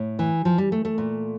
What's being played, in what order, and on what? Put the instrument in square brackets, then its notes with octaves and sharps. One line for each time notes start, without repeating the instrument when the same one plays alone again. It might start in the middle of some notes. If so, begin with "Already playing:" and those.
Already playing: [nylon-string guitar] A2
E3
F3
G3
A3
A3
A#2